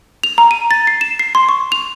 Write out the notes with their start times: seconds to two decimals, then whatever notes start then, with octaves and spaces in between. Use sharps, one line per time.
0.23 F7
0.38 A#5
0.51 D#7
0.71 A6
0.87 C7
1.01 E7
1.19 C7
1.35 C6
1.49 C#6
1.72 F7